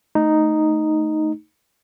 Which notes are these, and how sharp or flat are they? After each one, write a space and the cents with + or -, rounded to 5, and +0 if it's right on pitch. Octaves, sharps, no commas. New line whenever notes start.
A3 +0 D#4 -5